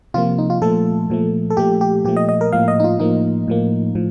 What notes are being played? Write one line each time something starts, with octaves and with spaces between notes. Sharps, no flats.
C3 F3 A#3 F4
D#4
F4
A#2 F3 A3 A4
A#2 F3 A3
A4
A#2 F3 A3 G4
G4
A#2 F3 A3 G4
D#5
D#5
A#4
A2 F3 A#3 F5
D#5
D#4
F4
A2 F3 A#3 D#4
A2 F3 A#3
A2 F3